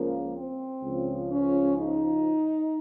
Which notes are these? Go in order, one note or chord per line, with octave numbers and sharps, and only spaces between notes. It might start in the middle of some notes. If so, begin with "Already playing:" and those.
Already playing: C#2 C#3 F3 A#3
C4
C#2 C#3 F3
C#4
D#4